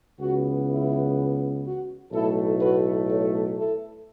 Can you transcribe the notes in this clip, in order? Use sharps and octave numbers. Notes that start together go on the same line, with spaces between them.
C#2 C#3 E3 B3 F#4
E4
F#4
B1 A2 A3 E4 A4
F#4 B4
A4 C#5
E4 A4